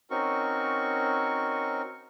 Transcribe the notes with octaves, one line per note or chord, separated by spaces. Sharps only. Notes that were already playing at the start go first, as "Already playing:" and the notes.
C4 C#4 D#4 F#4 A#4 C#6